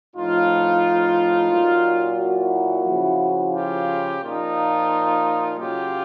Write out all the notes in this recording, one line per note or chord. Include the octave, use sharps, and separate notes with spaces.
A2 F3 D#4 F4
A#2 F#3
E4 F#4
C#3 F3
F4 G4
A#2 F3 D#4 F4
C#3 F#3 F4 G4